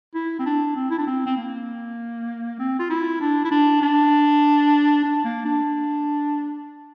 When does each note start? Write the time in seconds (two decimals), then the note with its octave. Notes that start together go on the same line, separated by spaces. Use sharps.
0.15 E4
0.39 C4
0.46 D4
0.76 C4
0.90 E4
0.98 D4
1.07 C4
1.26 C4
1.37 A#3
2.59 C4
2.79 F4
2.90 E4
3.21 D4
3.45 E4
3.51 D4
3.82 D4
5.04 D4
5.24 A#3
5.45 D4